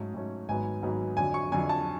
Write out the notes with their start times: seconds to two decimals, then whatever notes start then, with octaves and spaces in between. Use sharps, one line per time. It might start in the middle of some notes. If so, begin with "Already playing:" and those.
Already playing: G#2 F#3 A3 C#4
0.14 G#2 F#3 A3 C#4
0.48 G#1 G#2 F#3 B3 G#5
0.82 G#1 G#2 F#3 B3
1.17 F2 D3 F#3 G#5
1.34 C#6
1.52 F2 D3 F#3 G#5
1.69 A5